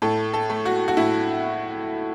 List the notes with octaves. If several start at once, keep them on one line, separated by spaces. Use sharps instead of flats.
A2 A4
A4
A3
F#4
F#4
A2 E4